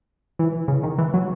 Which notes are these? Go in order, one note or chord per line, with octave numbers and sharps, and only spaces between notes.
E3
C#3
D#3
E3
F#3